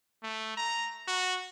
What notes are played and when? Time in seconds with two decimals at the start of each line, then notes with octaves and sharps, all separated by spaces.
0.23 A3
0.57 A#5
1.08 F#4